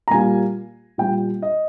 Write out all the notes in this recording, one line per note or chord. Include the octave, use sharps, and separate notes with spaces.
A#5
A#2 G3 A#3 G#5
A#2 G3 A#3 G5
D#5